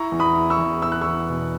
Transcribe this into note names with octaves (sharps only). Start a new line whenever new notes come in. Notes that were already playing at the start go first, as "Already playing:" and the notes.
Already playing: E4 A#5 C#6
E2
B5 D#6
E4
C#6 E6
E2
E4 E6
F#6
E2 C#6 E6
B2